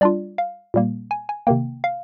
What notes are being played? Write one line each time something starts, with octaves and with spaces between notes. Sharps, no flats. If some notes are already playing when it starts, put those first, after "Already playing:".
G3 D4 F4 D5
F5
A#2 G3 A#3
G#5
G#5
C3 D#3 A#3 G5
F5